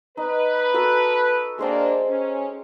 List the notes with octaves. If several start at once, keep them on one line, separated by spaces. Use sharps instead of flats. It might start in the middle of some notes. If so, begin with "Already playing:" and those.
D#4 B4
F#4 A4 A#4
G#3 A#3 D4 C5 G5
C#4